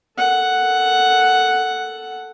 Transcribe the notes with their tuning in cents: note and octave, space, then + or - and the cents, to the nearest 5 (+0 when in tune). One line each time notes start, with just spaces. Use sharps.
A4 +0 F#5 +0